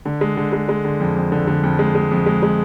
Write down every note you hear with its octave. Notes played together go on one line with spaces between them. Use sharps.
D3
G#3
D3
G#3
G#3
D3
F2
F2
D3
D3
F2
G#3
G#3
F2
G#3
G#3